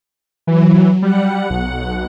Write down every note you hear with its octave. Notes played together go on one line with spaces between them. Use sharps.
E3 F#3
G3 F#5
B1